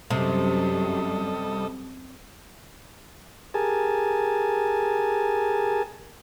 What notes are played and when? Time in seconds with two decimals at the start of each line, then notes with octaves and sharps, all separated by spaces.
0.10 F#2 C3 G3 A4 D#5
3.54 G4 G#4 A#4 G#5 A5